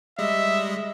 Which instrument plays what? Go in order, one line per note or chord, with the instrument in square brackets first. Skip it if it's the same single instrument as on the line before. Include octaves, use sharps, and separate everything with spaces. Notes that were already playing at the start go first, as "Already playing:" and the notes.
[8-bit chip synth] G3 G#3 D#5 [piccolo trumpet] E5